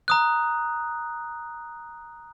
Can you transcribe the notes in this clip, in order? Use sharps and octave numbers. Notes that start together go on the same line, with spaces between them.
A#5 D#6 F#6